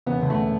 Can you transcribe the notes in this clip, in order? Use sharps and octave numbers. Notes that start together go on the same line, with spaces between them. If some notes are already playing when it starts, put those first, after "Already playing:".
E1 B3
D3
A3